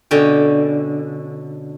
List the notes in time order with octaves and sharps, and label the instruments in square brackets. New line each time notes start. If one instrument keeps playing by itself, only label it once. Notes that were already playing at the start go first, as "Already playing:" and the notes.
[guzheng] B2 D3 C#4 G5